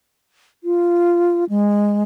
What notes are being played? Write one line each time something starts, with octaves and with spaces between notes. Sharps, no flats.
F4
G#3